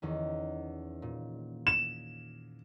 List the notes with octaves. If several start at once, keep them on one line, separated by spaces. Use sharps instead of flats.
E2 D#3 C#4
A#2
E7